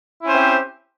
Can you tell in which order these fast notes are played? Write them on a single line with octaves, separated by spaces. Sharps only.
E4 C#4 C5 C4 G4